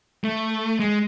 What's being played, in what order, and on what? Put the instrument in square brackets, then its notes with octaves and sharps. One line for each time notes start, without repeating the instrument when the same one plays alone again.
[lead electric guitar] A3
G#3